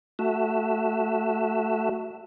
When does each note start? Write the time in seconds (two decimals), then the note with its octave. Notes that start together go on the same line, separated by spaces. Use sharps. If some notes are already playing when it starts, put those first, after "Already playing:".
0.19 A3 F#4 E5